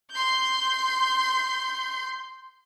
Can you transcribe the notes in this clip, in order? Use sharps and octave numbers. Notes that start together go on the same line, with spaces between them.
C6 G6